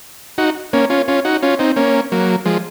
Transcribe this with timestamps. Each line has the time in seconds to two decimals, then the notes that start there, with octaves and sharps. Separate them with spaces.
0.38 D#4 F#4
0.73 A#3 C#4
0.90 C#4 F4
1.08 C#4 F4
1.25 D#4 F#4
1.43 C#4 F4
1.59 C4 D#4
1.76 A#3 C#4
2.12 F#3 A#3
2.45 F3 G#3